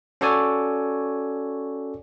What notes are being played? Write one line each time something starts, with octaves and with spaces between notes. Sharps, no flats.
C#4 F#4 A4 C#5 D5 G#5